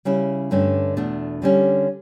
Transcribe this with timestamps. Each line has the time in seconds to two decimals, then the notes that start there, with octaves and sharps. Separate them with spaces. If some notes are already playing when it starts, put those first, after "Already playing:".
0.05 C#3 G3 C#4 E4
0.51 G2 D3 A3 C#4
0.97 E2 B2 A3 D4
1.42 D3 G3 C#4